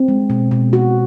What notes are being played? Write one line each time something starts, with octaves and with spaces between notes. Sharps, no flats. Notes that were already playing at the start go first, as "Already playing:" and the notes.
Already playing: C4
G#3
B2
B2
F#4